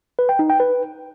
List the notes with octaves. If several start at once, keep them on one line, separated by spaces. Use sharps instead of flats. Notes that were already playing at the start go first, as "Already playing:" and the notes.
B4
G5
D#4
G5
B4